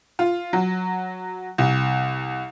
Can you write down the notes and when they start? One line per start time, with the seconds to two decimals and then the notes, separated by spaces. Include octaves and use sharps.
0.19 F4
0.53 F#3
1.58 C2